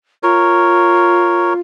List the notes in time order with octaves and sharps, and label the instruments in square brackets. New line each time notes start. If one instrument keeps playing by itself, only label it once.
[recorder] F4 [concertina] A#4 C#5